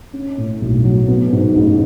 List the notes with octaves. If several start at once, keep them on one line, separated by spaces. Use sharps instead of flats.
C#4
A2
B1
F#3
B3
G#2
A1